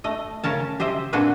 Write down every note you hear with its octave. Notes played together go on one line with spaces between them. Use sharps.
A3 D#5
C#3 C#4 A#4 A5
G4 C5 D#5 E5
A#2 C4 D4 F#4 G#4 B4